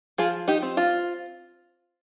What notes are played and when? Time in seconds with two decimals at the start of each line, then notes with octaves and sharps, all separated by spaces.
0.18 F3 F4 G#4
0.48 D#4 G4
0.62 C4
0.77 F4